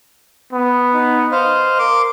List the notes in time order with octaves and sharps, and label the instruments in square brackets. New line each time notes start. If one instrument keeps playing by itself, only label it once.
[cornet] B3
[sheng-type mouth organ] D#4
C5 D#5 F5
[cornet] A#4 [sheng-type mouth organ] C6 D6